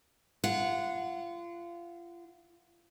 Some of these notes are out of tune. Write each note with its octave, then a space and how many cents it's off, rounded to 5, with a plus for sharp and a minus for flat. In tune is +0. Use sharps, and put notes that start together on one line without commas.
F4 -30 F#5 -10